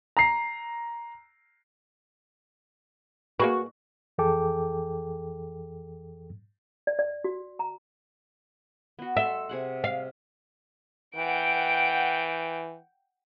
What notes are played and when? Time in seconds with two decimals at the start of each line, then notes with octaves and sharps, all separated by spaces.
0.17 A#5 C7
3.40 A#3 F#4 G#4 B4
4.18 F2 E3 G#4 A4 G5 D6
6.87 D5
6.99 D5
7.24 F#4
7.59 A#5
8.99 B3 F#4
9.17 A4 E5 C6
9.49 C3 G#4 F#5
9.84 F5
11.17 E3 F#5 G5 D7